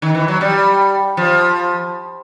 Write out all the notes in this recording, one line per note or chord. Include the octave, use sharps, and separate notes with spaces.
D#3
E3
F#3
G3
F3